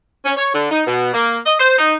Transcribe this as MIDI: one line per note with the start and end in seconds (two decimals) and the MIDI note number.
0.24 0.32 61
0.36 0.50 73
0.54 0.67 50
0.70 0.82 63
0.87 1.09 47
1.13 1.38 58
1.46 1.57 75
1.60 1.74 72
1.78 1.94 63